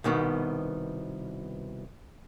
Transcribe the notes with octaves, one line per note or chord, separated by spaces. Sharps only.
C2 B2 D#3 B3